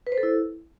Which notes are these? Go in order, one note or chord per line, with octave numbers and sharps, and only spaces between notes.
B4
C5
A4
E4